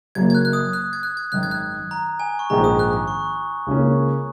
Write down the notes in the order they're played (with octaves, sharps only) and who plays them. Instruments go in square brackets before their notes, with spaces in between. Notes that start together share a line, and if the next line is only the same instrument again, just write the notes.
[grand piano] F#1 F#2 F#3 A#3 [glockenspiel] G#6
[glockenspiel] G#6
F#6
F#6
D#6
F#6
G#6
F#6
G#6
[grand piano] G#1 F#2 D#3 [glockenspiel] F#6
[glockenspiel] G#6
F#6
A#5
G#5
C#6
[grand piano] A#1 G#2 D#3 G#3 [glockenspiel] A#5
[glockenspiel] D#6
F#6
F#6
C#6
[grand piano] C#2 C#3 A#3 C#4